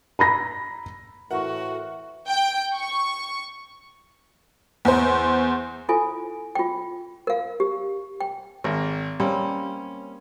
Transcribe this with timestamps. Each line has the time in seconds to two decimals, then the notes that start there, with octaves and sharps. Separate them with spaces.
0.19 A#5 B5 A#6
1.31 A2 E3 F#4 A#4 E5 F#5 C#6
2.27 G5
2.75 C#6
4.85 E2 C5
5.89 E4 F4 A4 G#5
6.55 F4 G5
7.27 A#4 F5
7.60 G4
8.21 G5
8.64 G#1 A#4
9.20 G3 A#3 C4 C#4